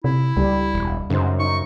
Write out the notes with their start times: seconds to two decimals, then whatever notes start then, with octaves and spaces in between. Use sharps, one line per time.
0.04 C3 E4
0.37 C#2 G3
0.74 E1
1.10 F#2 C#3 D#4 C5
1.40 D#4 C#6